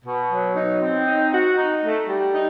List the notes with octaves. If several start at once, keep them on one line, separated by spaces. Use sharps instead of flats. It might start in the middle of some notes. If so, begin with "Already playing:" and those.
B2
F#3
D#4
C4
D#4
F#4
D#4
A3
G3
D#4